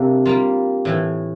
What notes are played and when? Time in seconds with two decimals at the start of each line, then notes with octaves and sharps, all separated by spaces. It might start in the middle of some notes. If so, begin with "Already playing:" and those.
Already playing: C3 G3 A#3 C4 D4 A4
0.25 G3 A#3 F4
0.85 A2 E3 A3